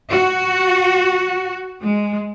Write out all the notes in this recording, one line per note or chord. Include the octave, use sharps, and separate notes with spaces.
F#4
G#3